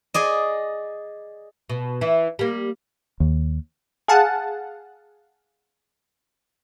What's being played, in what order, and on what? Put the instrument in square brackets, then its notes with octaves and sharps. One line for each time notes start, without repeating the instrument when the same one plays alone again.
[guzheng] G#4 D5 D#5
[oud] B2
E3 E4
G3 A#3
[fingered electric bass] D#2
[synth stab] G#4 F5 F#5 A5